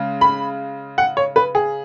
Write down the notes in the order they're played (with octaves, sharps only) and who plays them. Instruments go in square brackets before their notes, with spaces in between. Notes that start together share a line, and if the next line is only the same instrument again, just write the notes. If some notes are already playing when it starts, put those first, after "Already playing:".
Already playing: [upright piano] C#3 G#3
B5
F#5
C#5
B4
G#4